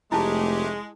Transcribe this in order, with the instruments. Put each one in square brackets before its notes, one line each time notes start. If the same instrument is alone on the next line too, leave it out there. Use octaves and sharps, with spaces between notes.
[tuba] F1 [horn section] G#3 [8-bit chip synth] A3 G4 [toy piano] E4 A5